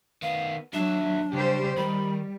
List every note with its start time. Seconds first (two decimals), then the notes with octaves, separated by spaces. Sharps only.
0.22 D#3 B3 F5
0.73 D#2 F#3 D4 E5
1.33 C#3 G3 G4 C5
1.77 D#3 G3 B5